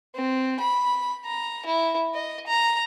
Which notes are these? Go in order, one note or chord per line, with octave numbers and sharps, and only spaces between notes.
C4
B5
A#5
E4
D#5
A#5